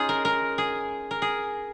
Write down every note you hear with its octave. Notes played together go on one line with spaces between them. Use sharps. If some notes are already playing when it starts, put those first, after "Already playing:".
Already playing: C#4 D#4 F4 G#4
A#4
A#4
G#4
A#4
G#4